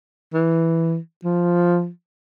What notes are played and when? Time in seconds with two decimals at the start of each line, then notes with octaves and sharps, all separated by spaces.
0.33 E3
1.24 F3